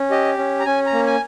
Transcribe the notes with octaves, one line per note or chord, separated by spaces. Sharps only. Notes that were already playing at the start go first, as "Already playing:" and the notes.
Already playing: C#4
G4 D#5
C#4
A#5
C#4 G#5
A#5
A#3
G#5